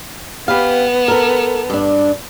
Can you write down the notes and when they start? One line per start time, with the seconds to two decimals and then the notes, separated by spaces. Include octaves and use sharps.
0.48 B3 G4 B4 F5
1.08 A4 A#4
1.70 G2 D4